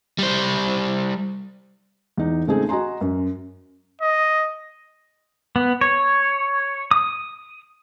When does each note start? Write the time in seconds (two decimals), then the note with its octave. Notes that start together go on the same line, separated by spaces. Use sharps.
0.18 G3 C5
2.17 E2 D#4
2.47 C#3 G#3 A3 C4 D#4 G#4
2.69 F#4 D#5 G#5 A#5 C6
3.01 F#2
4.02 D#5
5.56 B3
5.81 C#5
6.91 D#6